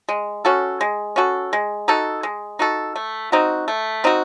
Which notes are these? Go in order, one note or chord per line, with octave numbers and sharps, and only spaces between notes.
G#3
C#4 F#4 A4
G#3
C#4 F#4 A4
G#3
D#4 F#4 A4
G#3
D#4 F#4 A4
A3
C4 D#4 F#4
A3
C4 D#4 F#4